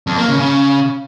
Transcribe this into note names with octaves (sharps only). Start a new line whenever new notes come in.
F2
A#3
C#3
C#3